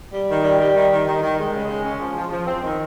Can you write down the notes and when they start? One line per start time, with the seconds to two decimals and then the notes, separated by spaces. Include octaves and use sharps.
0.13 G3
0.29 D#3
0.44 G3
0.59 G3
0.75 D#3
0.92 D#3
1.06 D#3
1.23 D#3
1.38 G#3
1.54 C#3
1.69 G#3
1.84 C#4
2.00 F3
2.16 F3
2.32 F3
2.47 C4
2.62 D#3